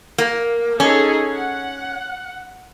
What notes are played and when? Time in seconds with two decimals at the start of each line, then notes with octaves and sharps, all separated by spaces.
0.18 A#3
0.80 C#4 D#4 G#4 A4
1.34 F#5